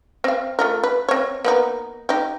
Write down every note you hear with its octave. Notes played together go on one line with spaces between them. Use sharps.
C4 F5
A3 F4 A#4
B4
C4 C#5
A#3 B3 D#4
D#4 G4